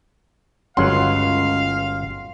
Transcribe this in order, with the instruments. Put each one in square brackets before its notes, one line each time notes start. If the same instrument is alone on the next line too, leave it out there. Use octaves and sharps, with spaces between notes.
[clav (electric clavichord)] G1 F#3 F#5 [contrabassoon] C#2 [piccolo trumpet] F5 [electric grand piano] C6